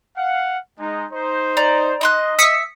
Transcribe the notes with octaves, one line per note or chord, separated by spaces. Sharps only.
F5 F#5
G#3 D#4
D#4 C5
D5 A#5
D#4 D#5 C6 F#6
E5 D#6 E6 B6 C#7